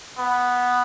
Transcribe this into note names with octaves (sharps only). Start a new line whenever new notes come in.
B3